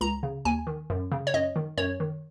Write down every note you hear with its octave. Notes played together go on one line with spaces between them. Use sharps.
C#2 A#5
C#3
D#2 G#5
D#3
F#2
C#3
C#5
F#2 D#5
D#3
F#2 C#5
D#3